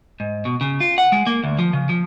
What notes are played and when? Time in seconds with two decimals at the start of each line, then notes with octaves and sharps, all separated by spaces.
0.20 G#2
0.45 B2
0.61 C#3
0.80 F4
0.98 F#5
1.12 G#3
1.27 A#3
1.44 D2
1.59 F3
1.73 C#3
1.89 F3